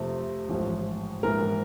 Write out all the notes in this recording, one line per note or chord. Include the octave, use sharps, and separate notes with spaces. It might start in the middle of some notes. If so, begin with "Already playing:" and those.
Already playing: F2 C3 F3 A3
A1 G#2 F3 A3
A#1 G#2 E3 G#3 A#4